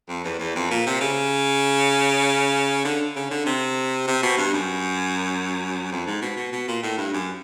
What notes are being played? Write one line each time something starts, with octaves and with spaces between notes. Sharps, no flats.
F2
E2
E2
F2
A#2
C3
C#3
D3
C#3
D3
C3
C3
B2
G2
F#2
F2
G#2
B2
B2
B2
A#2
A2
G2
F#2